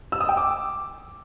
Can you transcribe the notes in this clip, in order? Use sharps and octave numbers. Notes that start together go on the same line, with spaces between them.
E6
D#6
G5
D6